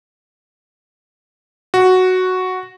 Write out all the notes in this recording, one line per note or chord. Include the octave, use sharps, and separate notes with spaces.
F#4